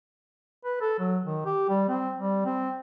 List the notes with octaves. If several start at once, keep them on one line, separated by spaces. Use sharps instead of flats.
B4
A4
F#3
D#3
G4
G3
C4
G3
C4